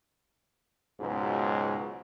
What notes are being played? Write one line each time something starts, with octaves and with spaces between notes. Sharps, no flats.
C#2 G#2 B2 F#3